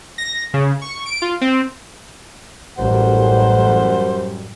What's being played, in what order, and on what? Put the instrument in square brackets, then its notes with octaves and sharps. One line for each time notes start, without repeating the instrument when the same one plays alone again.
[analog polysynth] A#6
C#3
C#6
D7
F4
C4
[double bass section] A1 [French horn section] F#2 G3 [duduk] C5 [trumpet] F#5